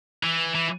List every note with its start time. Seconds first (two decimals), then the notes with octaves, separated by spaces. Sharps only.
0.23 E3
0.55 E3